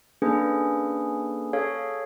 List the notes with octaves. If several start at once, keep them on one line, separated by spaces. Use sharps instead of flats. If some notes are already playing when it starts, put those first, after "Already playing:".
A#3 C#4 D4 G#4 A4 B4
G#4 A4 C#5 F5